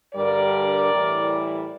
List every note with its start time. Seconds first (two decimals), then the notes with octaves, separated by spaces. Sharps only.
0.15 G2 D3 G3 A#4 D5
0.92 A2 E3 G3